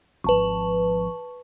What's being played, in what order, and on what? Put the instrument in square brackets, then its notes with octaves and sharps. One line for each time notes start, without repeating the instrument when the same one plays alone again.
[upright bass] G#1 F3 [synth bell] B4 A5 C#6